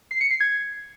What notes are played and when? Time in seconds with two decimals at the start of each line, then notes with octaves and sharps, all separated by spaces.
0.11 C7
0.21 C#7
0.31 C7
0.40 G#6